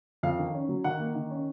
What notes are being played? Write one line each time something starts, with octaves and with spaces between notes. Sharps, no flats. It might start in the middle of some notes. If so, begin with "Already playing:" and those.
F2 F5
D#3
C#4
F#3
D#3 F#5
A#3
D#3
C#4